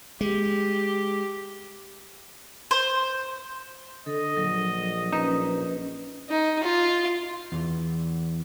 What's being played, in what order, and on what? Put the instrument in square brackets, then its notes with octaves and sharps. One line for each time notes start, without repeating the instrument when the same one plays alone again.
[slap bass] G#3 [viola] G4
[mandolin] C5
[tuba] D3 [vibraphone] A4 [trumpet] D#5
[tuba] A#1 [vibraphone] F#3
[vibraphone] C#4 B4 [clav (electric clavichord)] D#4
[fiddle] D#4
F4
[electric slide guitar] E2 E3